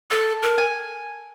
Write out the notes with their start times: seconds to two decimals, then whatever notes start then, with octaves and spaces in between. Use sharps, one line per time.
0.11 A4 A5
0.43 A#4
0.58 G#5